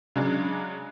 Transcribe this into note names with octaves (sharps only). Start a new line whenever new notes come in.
C#3 F#3 G#3 D4